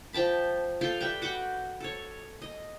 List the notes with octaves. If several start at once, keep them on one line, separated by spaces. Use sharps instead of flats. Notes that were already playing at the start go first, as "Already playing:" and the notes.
F3 G5 A5 B5
F4 A4 F5 G5
G3 B4 E5 G5
F#4 F#5 G5 D6
A4 C#5
D#5